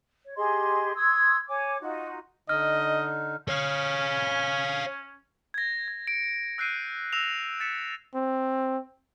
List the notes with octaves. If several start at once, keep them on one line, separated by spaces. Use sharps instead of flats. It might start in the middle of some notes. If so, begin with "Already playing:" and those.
C#5
G4 G#4 D#5 C6
C6 D#6 E6 G#6
C#5 G#5 D6
D#4 F4 F#4
D3 D#4 D#5 F6
C#4 C#5 F5
G#6 A#6
G#6
C#7 D7
E6 F#6 G6 C7 D7 D#7
E6 A#6 E7 F7
A6 B6 C#7 E7
C4